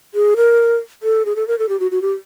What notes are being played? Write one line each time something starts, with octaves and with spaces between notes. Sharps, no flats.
G#4
A#4
A4
G#4
A4
A#4
A4
G4
F#4
F#4
G4